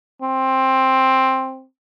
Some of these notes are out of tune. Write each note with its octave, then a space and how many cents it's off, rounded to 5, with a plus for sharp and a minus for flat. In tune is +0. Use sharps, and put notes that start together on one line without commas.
C4 +10